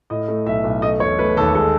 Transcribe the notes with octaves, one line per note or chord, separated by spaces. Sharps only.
A2 D#5
A3
B1 E5
B1
A3 D#5
E1 C#5
A3 B4
D#2 A4
G#3 A4